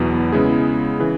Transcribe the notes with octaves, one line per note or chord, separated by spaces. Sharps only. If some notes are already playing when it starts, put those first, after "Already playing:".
Already playing: E2 B2 F#3 B3 E4
C#3 G#3 B3 E4 G#4
C#3 E3